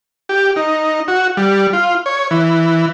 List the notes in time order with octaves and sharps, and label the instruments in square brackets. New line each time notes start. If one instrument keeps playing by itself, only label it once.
[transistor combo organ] G4
D#4
F#4
G3
F4
C#5
E3